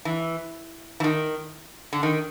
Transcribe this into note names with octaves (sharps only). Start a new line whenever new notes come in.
E3
E3
D#3
D3
D#3